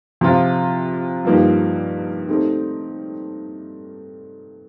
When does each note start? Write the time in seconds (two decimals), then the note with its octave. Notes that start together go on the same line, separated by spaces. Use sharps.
0.21 C3 F3 C4 F4
1.25 G2 F3 A#3 D#4 G4
2.29 A3 C4 D#4 G4